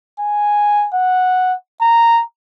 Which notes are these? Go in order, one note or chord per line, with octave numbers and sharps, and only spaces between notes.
G#5
F#5
A#5